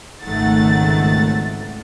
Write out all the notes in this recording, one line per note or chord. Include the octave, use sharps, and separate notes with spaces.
G#1 C#2 D#3 A3 F#5 A6